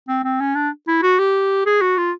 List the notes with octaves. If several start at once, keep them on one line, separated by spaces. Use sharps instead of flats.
C4
C4
C#4
D4
E4
F#4
G4
G#4
F#4
F4